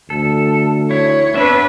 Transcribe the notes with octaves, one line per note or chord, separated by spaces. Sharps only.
D2 A4
E4 C#5
B3 C4 D4 B4 E5